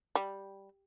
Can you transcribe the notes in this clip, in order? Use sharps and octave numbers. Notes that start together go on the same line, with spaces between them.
G3